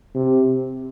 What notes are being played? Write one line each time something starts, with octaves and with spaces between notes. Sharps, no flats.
C3